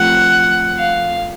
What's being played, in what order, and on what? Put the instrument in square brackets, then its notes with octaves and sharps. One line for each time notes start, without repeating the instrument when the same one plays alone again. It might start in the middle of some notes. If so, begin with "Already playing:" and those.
Already playing: [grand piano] F3 A3 C4 [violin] F#5
[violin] F5